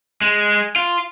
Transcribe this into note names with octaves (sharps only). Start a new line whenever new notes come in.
G#3
F4